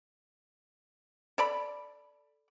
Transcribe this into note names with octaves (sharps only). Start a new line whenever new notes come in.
A4 D5 B5